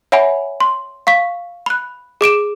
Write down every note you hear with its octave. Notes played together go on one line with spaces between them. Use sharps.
C#5 E5 F#5 G#5 B5
C6
F5 C#6 B6
B5 F#6
G#4 D6 D7 E7